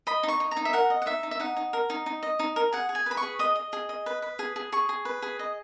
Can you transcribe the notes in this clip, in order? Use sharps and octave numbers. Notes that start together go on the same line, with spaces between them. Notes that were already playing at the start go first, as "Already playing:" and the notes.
D#5 B5
D#4
C#6
D#4
A#5
D#4
E5
A#4 F#5
D#5
F#5
D#4 E5
D#4
E5
D#4 F#5
D#4
A#4
D#4
D#4
D#5
D#4
A#4
G#4 F#5
G#4
G#5
B4 B5
C#6
G#4
D#5 D#6
D#5
G#4
D#5
B4
B4
G#4
G#4
G#4 C#6
G#4
B4
G#4
D#5